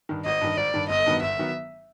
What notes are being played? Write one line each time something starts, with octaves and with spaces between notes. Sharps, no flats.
G2 D#3
G#1 D#5
G2 D#3
G#1 D5
G2 D#3
G1 D#5
G2 D#3 F#3 B3
G1 E5
D#3 F#3 B3